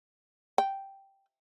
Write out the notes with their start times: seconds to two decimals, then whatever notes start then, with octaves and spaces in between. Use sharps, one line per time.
0.58 G5